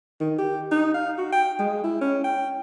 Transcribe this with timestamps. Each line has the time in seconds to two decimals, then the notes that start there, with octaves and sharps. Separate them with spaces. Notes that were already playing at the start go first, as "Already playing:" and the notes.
0.20 D#3
0.39 G4
0.72 D#4
0.94 F5
1.18 F#4
1.32 G5
1.59 G#3
1.84 E4
2.02 C#4
2.24 G5